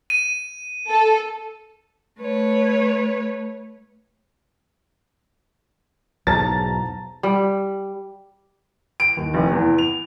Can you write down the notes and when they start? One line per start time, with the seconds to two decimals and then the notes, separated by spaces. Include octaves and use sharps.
0.10 D#7
0.88 A4
2.20 A3 B4 C#5
6.27 B1 E2 G#2 A5 A#5 A6
7.23 G3
9.00 D7
9.17 D#2
9.34 F1
9.51 E2
9.78 F7